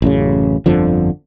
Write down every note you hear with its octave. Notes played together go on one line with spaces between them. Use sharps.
A1 F#2 C#3
G1 F2 D3 F3